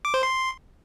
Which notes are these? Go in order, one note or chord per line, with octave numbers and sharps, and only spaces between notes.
D6
C5
C6